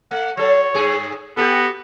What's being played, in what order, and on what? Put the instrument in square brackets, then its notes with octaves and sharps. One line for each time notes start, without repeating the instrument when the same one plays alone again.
[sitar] A3 [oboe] F#5
[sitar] F#3 A4 [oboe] C#5
[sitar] G2 G#4
[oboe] B3 [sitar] F#4 G4 A4